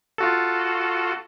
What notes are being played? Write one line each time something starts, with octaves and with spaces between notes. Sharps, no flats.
F4 F#4 A4